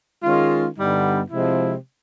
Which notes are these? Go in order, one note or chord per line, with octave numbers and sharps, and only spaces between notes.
D#3 G#3 C#4 F4
G2 D3 G3 B3 D#4
C3 F3 G#3 C4 E4